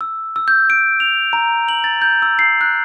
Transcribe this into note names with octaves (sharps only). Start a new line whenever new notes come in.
E6
E6
G6
D7
F7
A#5
F#7
A6
G6
E6
C7
F#6